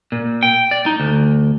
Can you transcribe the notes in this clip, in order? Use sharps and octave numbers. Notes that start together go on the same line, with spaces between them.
A#2
G5
D5
D#4
D2